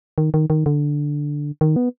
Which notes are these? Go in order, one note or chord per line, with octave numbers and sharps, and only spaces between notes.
D#3
D#3
D#3
D3
D#3
B3